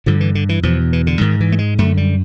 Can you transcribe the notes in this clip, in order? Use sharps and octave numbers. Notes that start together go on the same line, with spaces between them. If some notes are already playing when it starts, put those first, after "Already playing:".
G2 D3 F3
E3
D3
E3
E2 B2 F3
E3
D3
G#2 D#3
E3
A3
G#3
F#2 D3 A3
G3